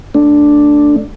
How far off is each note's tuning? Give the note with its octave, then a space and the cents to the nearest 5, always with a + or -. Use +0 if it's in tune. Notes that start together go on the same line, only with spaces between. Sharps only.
A3 +0 D4 +0